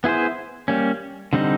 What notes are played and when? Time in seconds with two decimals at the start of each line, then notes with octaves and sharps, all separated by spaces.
0.04 B3 E4 G#4 C5
0.68 G3 A#3 C#4
1.33 D3 G3 C4 D#4